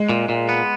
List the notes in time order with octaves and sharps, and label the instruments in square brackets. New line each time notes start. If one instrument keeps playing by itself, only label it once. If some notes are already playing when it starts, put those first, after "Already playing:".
Already playing: [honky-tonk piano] G#3
[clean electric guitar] A#2
A#2
B3